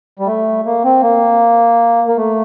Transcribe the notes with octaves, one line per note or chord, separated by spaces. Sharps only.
G3
A3
A#3
C4
A#3
A#3
A3